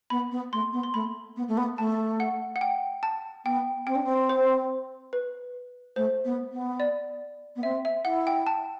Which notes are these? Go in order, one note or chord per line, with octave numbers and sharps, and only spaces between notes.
B3 B5
B3
A3 C6
B3
C6
A3 B5
B3
A3
B3
A3 A5
F#5
F#5
G5
A5
B3 G5
C4 G5
D4
C4
C5
B4
A3 C5
B3
B3
D5
B3
C4 E5
E5
E4 F#5
G5
A5